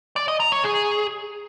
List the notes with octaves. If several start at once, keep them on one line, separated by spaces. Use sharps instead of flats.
D5
D#5
A#5
C#5
G#4